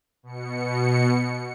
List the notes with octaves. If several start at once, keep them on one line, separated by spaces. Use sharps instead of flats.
B2 C#7